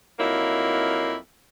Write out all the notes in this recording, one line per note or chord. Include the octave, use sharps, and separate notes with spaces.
F2 F#3 A#3 D#4 E4